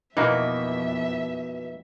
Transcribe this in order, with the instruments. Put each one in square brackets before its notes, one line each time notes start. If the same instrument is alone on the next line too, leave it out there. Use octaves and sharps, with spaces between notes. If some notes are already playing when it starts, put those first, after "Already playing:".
[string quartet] F2 E5 [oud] B2 [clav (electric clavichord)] E3 A#3 F#4 [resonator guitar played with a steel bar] D#4